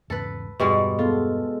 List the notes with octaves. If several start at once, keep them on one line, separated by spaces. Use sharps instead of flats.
E2 G#2 C#3 A4 B4
E1 G2 B2 G3 G#3
G#3 B3 F4 A4